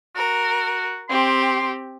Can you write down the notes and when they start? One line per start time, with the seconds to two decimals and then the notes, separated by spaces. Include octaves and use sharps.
0.16 F#4 A#4
1.09 C4 G4 C6